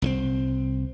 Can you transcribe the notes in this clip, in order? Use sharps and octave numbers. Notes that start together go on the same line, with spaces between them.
C2 F3 C4